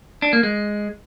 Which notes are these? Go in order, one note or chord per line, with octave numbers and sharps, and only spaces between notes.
D4
A#3
G#3